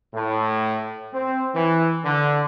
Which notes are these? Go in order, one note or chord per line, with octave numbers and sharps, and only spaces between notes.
A2
C4
E3
D3